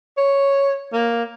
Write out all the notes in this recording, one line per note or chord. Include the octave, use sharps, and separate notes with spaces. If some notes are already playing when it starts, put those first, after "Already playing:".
C#5
A#3